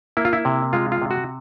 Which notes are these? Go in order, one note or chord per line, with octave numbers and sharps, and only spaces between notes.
A#3 E4
F4
E4
C3
G#3 F4
F4
C3
F#4